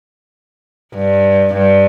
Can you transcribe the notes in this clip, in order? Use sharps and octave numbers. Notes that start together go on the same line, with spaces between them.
G2
G2